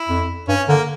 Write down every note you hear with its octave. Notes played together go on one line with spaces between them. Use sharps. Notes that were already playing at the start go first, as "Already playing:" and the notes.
Already playing: E4
F2
G2 C#4
D3 A#3